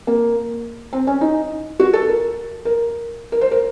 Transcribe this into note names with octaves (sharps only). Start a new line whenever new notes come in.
A#3
C4
C#4
D#4
F#4
A4
A#4
A#4
A#4
C5
A#4